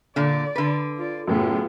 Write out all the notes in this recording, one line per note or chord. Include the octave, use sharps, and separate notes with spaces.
A#2 D3 D5
D3 B4
F4 D5
F#2 A2 C#3 B3 F4